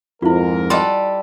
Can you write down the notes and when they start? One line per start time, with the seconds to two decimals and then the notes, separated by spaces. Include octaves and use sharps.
0.22 F2 G#2 E4 F4 A#4
0.70 G3 A4 D#5 F#5 C6